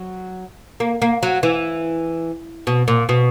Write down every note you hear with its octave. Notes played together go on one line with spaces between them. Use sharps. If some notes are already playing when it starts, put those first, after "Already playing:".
Already playing: F#3
A#3
A#3
F#3
E3
B2
A#2
B2